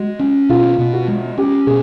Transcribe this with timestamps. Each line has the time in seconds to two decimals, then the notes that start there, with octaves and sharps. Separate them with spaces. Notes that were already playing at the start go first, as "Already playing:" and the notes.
Already playing: G#3 F#4
0.19 C#4
0.49 B2 F4
0.79 B2
0.93 F#4
1.08 G#3
1.38 C#4 G4
1.67 B2 G#4